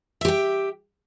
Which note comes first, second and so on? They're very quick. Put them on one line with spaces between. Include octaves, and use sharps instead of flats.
E5 G4 G5